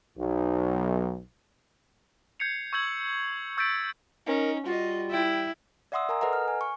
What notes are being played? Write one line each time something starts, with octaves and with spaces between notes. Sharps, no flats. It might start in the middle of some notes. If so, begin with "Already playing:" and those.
B1
G6 G#6 C7 C#7 F7
C#6 E6 G6 G#6 F#7
C#6 E6 G6 A6 B6 D7
C#4 D#4 A#4
G3 F4 F#4 D#5
E4 G5
D5 E5 F#5 C6 D#6 E6
A#4 G#5 A#5 D#6
A4 B4 D#5 F#5 A#5
F6
G#5
C#6